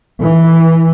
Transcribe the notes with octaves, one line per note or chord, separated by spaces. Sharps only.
E3